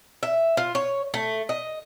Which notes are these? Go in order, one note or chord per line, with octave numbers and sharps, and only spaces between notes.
E5
F4
C#5
A3
D#5